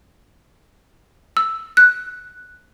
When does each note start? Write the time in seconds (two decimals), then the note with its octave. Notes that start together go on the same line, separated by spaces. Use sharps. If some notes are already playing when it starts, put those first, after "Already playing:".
1.37 E6
1.77 F#6